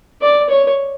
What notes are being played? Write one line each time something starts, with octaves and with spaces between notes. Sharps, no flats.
D5
C#5